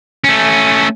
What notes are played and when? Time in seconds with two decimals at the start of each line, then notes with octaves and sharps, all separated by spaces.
0.24 A3 C#4